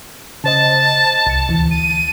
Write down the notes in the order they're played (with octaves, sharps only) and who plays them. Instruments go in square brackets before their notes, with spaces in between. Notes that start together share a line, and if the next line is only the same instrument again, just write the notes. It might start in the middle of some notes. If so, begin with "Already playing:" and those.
[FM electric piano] C#3 C5 D#5 [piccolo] A5
[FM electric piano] C2 C#7
D2 E3
[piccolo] D#7